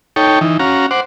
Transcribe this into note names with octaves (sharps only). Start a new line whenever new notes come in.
D#4 A4 C#5 G5
E3 D#4
C#4 F#4 F5 A#5
C5 F#5 D6